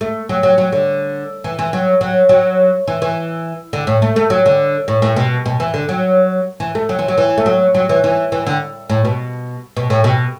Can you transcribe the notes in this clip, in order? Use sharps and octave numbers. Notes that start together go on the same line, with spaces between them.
A3
F#3
F#3
F#3
D3
E3
E3
F#3
F#3
F#3
E3
E3
D3
A2
A3
A3
F#3
D3
A2
A2
B2
B2
E3
D3
F#3
E3
A3
F#3
E3
F#3
E3
A3
F#3
F#3
E3
E3
E3
D3
A2
B2
B2
A2
B2